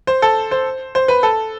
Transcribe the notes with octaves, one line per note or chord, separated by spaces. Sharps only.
C5
A4
C5
C5
B4
A4